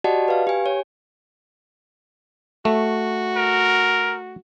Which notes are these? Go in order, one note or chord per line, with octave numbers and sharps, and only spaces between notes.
F#4 G4 D5 D#5 F#5 A5
B4 F5
G4 G#5
C#5
A3 F#4
A#4